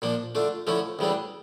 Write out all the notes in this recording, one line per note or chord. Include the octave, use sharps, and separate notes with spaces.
A#2 F3 A#3 D4
D3 A3 D4 F4
D3 F3 A3 C#4 E4
D2 C#3 E3 G3 D4